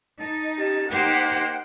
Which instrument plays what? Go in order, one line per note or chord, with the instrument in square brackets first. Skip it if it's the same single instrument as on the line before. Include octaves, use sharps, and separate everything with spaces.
[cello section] D#4 [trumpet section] A5
[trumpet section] C#4 A5 [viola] G4
[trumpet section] A#3 [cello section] D#4 G4 C5 [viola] F#5 G5